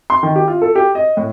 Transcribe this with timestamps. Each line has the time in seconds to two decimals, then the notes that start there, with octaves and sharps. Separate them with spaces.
0.10 C6
0.23 D#3
0.36 G4
0.48 F4
0.62 A4
0.75 G4
0.95 D#5
1.17 A2